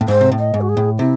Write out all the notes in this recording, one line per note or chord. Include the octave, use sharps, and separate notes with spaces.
A2
G#2 C5
C3
A2
D#5
G#2
F#4
G#4
A2
C3 E4